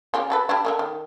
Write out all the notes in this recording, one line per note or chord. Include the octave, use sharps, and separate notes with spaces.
C#3 F4 G4
F#4 A4 B4
G3 D4 E4
D3 D#3 A#3
D#3